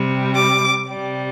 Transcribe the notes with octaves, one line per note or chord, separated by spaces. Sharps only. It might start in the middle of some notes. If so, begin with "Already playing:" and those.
Already playing: C3 G3
D6
C3 G3